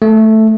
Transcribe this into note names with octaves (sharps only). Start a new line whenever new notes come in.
A3